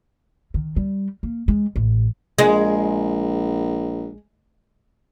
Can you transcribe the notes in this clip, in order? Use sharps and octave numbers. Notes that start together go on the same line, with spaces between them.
D#3
G3
A#3
G#3
A1
A#1 G#3